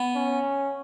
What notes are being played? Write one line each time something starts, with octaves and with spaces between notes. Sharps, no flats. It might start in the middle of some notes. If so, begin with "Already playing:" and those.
Already playing: B3
C#4